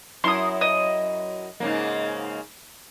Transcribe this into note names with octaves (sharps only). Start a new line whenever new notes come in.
F#2 E4 C6 D#6
D#5
G#2 C#3 A#3